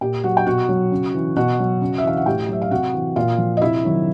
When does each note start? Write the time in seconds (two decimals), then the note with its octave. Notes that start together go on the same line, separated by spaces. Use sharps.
0.01 A#2 G4 G5
0.24 F#3 F#4 F#5
0.37 G5
0.46 B2 F#4 F#5
0.69 F#3
0.92 C#3
1.14 E3
1.36 B2 F#4 F#5
1.59 F#3
1.82 C#3
1.98 E5
2.03 E3 F5
2.17 F#5
2.26 A2 G4 G5
2.49 F#3 E5
2.62 F5
2.71 C3 F#4 F#5
2.94 E3
3.16 A#2 F4 F5
3.38 F3
3.57 D#5
3.61 C3 E4 E5
3.84 D#3 F#3